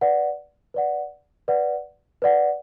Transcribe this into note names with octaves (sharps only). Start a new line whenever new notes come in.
B4 D5 F#5
B4 D5 F#5
B4 D5 F#5
B4 D5 F#5